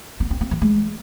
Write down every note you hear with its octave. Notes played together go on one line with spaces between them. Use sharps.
B3
C4
C4
E3
G#3